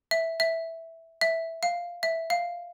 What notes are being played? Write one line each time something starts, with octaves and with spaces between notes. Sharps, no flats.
E5
E5
E5
F5
E5
F5